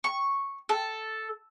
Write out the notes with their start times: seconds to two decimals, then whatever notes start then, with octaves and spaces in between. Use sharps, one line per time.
0.04 C#6
0.69 A4